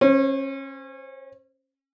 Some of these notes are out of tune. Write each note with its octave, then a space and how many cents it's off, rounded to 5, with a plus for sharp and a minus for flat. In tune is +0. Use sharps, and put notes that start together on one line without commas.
C#4 -30 C5 +0